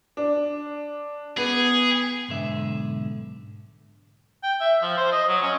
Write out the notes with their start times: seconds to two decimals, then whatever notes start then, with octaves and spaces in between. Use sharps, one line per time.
0.17 D4
1.37 B3 G#4
2.29 B1 G#2 D3 E5
4.43 G5
4.60 E5
4.82 F3
4.97 C5
5.12 D#5
5.29 F#3
5.42 C#4